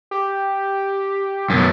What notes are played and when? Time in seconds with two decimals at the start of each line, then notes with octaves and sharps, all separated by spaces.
0.11 G4
1.50 F#2 B2 A6